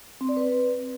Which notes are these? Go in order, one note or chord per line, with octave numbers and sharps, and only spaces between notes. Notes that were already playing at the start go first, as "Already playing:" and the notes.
C4
D5
B4